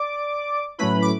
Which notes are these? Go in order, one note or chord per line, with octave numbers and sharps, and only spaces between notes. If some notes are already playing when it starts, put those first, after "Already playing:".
Already playing: D5 D6
A2 F#3 A3 C#4 E4 B4 B5
D6